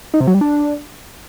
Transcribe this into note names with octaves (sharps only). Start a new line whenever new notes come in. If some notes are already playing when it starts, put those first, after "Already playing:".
D#4
C3
F#3
G3
D4